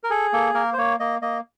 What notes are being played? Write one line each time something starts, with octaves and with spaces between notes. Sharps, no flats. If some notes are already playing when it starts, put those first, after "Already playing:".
A#4
G#4 A4
A#3 A4
A#3 A#4
C5
A#3 C#5
A#3 D#5
A#3 D#5